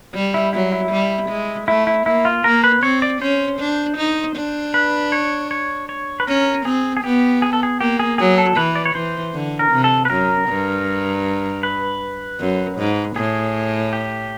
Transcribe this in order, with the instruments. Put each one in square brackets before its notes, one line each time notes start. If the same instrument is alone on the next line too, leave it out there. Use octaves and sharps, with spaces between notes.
[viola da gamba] G3
[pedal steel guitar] E4
[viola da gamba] F#3 [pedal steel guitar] E4
[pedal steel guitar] E4
[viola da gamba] G3
G#3
[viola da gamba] A3 [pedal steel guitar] E4
[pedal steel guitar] E4
[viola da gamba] A#3 [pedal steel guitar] E4
[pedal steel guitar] F4
[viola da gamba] A#3 [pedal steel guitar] A#4
[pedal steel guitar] B4
[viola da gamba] C4 [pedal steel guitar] C#5
[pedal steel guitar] D5
[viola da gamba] C#4 [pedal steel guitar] C5
[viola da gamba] D4
D#4
D4
[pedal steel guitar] B4
C#5
C#5
C#5
B4
[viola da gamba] C#4 [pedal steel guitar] A#4
[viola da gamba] C4 [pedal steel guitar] G#4
[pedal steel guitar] G#4
[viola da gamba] B3 [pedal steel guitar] G4
[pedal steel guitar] G#4
A4
G#4
[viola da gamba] A#3 [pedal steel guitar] G4
[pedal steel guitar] G#4
[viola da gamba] F#3 [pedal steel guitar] G#4
[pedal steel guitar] A4
[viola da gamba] E3 [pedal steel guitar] B4
[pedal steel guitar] D5
C#5
[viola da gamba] E3 [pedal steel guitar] C5
[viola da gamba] D3
[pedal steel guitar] A#4
[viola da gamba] C3
[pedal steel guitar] A4
B4
[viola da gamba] F#2 [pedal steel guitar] A#4
[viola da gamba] G2
[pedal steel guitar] B4
[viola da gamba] F#2
G#2
[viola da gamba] A2 [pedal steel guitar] G#4
[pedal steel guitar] G4